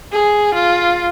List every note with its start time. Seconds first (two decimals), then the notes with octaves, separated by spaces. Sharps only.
0.13 G#4
0.55 F4